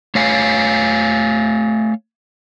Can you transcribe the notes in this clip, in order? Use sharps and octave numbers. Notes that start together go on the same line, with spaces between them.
A3 C#5 F5 G#5